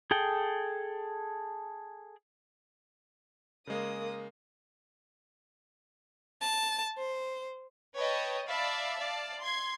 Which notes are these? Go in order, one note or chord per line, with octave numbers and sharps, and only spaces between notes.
G#4 A4 G5
C#3 G#3 A#3 D#6
A5
C5
B4 C#5 D#5 G5 A5
D5 E5 F5 A5 B5 D6
D5 F5 A5
C6 G#6